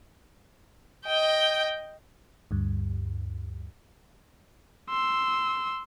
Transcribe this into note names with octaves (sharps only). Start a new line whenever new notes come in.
D#5 G5
D2 G2
C6 E6